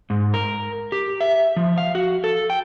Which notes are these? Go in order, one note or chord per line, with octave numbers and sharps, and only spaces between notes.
G#2
A#4
G4
E5
F3
F5
F#4
A4
G5